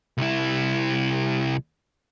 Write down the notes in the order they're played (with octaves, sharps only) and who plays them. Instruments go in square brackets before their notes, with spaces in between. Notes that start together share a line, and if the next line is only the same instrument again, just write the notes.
[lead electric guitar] C2 E4